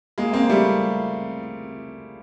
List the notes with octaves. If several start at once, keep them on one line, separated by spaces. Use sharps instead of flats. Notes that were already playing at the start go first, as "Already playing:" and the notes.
G#3 A#3
A#3 C4
G3 A3